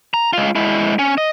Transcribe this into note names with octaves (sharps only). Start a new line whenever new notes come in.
A#5
G#3 F4
G#3 E4
C#4
D#5